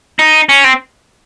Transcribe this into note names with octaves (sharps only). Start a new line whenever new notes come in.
D#4
C#4
C4